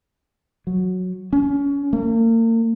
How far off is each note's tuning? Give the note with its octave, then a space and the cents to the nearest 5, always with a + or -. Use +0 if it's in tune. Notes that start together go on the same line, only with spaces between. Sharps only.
F#3 -10
C#4 +25
A#3 -40